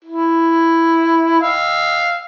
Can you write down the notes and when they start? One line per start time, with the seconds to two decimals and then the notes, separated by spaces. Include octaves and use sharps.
0.05 E4
1.41 F5 E6